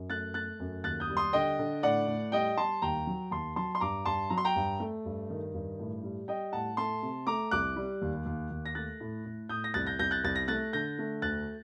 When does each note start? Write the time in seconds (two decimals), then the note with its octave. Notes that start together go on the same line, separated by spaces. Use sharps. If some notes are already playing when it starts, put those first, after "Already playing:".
Already playing: F#2
0.10 A3 F#6 A6
0.34 A3 F#6 A6
0.60 F#2
0.84 D#2 F#6 A6
1.00 D#6 G6
1.10 G3
1.17 C6 D#6
1.33 D3 D#5 G5
1.59 D3
1.83 A2 D5 F#5
2.07 A2
2.32 G3 D#5 G5
2.58 G3 A5 C6
2.82 D#2 G5 A#5
3.07 F#3
3.31 D#2 A5 C6
3.56 F#3 A5 C6
3.75 C6
3.80 G2 A#5 D6
4.05 G2 A5 C6
4.30 F#3 A#5
4.38 C6
4.45 G5 A#5
4.56 G2
4.80 A3
5.05 G2
5.30 D#3
5.54 G2
5.79 A2
6.03 G3
6.28 G3 D#5 G5
6.52 A2 F#5 A5
6.77 A3 A5 C6
7.03 C3
7.27 A3 A#5 D6
7.51 C2 D6 F#6
7.76 G3
8.02 D#2
8.26 D#2
8.50 D#2
8.66 A#6
8.75 A3 F#6 A6
9.00 A2
9.26 A2
9.49 A2 D#6 G6
9.64 A#6
9.74 C2 F#6 A6
9.87 G6 A#6
9.99 C2 G6 A#6
10.11 F#6 A6
10.24 C2 A6
10.36 A#6
10.48 A3 F#6 A6
10.73 D3 G6 A#6
10.99 A3
11.22 D2 F#6 A6